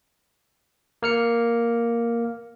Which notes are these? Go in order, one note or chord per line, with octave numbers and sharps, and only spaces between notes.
A#3 F6 C#7